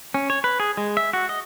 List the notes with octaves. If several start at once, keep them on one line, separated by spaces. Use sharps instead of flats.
C#4
C#5
B4
G#4
G#3
E5
F#4
D#5